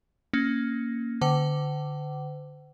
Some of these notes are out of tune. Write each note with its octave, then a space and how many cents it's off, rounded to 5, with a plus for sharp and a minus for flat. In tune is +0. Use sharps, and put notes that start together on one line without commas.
A#3 +0 C#4 +0
D3 +0 C5 -40 F#5 +40